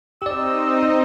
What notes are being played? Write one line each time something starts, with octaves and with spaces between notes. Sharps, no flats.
C4 D#4 G4 D5 D#5 E6